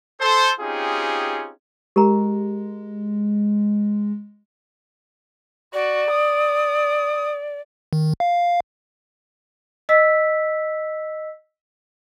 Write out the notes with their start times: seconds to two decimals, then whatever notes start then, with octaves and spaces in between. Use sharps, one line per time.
0.21 A4 C5
0.60 C4 C#4 D#4 F4 G4 G#4
1.96 G#3 G4 A#4 A#5
5.74 F#4 D5
6.10 D#6
7.93 D#3
8.20 F5
9.89 D#5 E6 B6